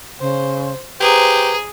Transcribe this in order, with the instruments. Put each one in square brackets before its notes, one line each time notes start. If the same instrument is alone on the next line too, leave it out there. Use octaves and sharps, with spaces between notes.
[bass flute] C#3 [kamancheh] C5
[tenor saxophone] G4 [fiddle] G#4 [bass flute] B4 [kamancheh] C5 A#5